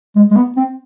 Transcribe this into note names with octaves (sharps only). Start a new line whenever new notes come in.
G#3
G#3
B3
C4